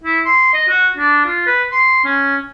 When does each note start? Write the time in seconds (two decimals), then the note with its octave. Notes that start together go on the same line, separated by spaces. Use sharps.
0.04 E4
0.25 C6
0.54 D#5
0.69 F#4
0.97 D4
1.25 F4
1.47 B4
1.72 C6
2.05 C#4